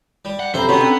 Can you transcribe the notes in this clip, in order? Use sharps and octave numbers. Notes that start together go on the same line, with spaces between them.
G3
F#5
F2 C3 C4 A4 C5 E5 A#5 B5
C3 B3 C#4 F#4 C5 C6
D3 C4